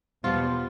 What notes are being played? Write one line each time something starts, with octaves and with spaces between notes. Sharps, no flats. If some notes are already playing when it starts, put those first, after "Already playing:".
E2 B2 F3 G3 B3 F4